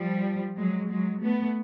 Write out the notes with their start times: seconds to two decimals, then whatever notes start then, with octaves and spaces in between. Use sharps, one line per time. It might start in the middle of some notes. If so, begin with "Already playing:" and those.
Already playing: F3 G3
0.57 F#3 G#3
0.89 F#3 G#3
1.21 A3 B3